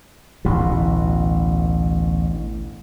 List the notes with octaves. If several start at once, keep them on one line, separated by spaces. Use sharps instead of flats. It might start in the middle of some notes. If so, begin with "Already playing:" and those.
A1 D2 B2